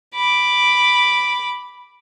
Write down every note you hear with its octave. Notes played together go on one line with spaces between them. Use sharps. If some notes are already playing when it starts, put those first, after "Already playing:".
B5 D6